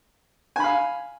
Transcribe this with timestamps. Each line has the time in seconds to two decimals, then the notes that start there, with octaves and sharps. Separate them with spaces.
0.56 G#5
0.60 B5
0.64 F5